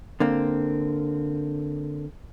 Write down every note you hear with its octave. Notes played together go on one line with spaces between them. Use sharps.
D3 A#3 C4